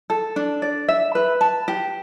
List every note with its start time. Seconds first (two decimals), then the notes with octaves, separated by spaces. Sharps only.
0.10 A4
0.36 D4
0.62 D5
0.88 E5
1.15 B4
1.41 A5
1.68 G4